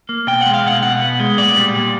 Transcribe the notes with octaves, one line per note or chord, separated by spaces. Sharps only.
A#3
B2 G5
G#3 F#5
F5
B2 F#5
B2 F#5
B3
G#3
A#2 D5
G3
A#2